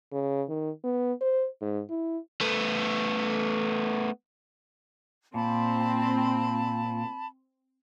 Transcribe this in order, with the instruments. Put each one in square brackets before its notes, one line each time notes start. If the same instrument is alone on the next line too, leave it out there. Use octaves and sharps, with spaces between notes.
[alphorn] C#3
D#3
B3
C5
G#2
E4
[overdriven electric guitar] A3 B3
[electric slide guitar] A#2 [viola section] C4 [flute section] A5 B5